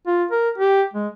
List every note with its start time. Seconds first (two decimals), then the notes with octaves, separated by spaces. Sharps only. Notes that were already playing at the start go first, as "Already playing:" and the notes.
0.07 F4
0.31 A#4
0.58 G4
0.94 G#3